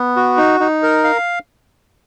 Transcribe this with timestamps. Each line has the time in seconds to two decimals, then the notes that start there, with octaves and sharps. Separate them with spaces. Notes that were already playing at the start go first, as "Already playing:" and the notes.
Already playing: B3
0.16 F#4
0.37 D#4
0.60 D#4
0.83 A#4
1.04 F5